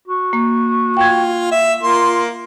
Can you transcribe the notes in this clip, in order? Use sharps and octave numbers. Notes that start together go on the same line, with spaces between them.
F#4
A#3
F4 G5 G#6
E5
A#3 F4 C6